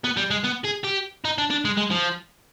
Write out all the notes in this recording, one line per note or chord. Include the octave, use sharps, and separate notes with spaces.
B3
G3
G#3
B3
G#4
G4
D#4
D4
D4
G#3
G#3
F3